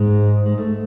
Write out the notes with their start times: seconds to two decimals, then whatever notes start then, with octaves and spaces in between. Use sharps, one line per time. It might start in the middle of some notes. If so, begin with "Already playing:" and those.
Already playing: G#2 G#3
0.46 G#3
0.58 A3